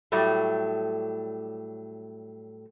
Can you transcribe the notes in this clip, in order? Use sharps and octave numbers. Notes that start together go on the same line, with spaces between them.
A2 F#3 G3 A3